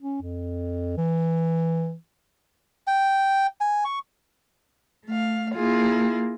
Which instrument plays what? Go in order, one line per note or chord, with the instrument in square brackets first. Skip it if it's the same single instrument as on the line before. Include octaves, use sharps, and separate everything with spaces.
[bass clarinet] C#4
F2
E3
[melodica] G5
G#5
C#6
[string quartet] A3 F5
A#3 E4 F4 G#4